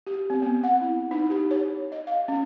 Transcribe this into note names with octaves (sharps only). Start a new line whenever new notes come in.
G4
C4
B3
F#5
E4
D#4
G4
C#5
D#5
F5
C#4